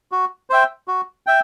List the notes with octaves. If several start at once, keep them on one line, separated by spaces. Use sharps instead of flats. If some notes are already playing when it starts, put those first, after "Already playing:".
F#4
C5 E5 G5
F#4
E5 G5